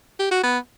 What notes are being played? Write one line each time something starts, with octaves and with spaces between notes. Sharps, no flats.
G4
F#4
B3